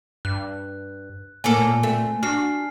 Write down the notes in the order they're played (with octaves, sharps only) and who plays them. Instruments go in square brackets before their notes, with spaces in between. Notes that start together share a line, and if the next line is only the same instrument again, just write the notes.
[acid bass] G2 [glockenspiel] F#6
[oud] A2 A#3 A4 [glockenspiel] G#5
[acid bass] A#2
[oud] A3 C4
[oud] D4 [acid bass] F#4 [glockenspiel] F6 C7